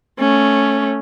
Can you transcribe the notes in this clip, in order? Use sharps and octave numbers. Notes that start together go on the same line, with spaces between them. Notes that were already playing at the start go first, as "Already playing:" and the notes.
A3 C#4